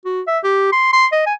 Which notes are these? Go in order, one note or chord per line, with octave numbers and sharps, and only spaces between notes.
F#4
E5
G4
C6
C6
D#5
G#5